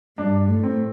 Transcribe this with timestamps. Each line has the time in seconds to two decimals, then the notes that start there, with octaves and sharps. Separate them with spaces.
0.18 G2 D4
0.48 A2
0.63 C4